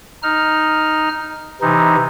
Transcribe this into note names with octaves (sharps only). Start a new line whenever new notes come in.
D#4 F6
C3 E3 D#4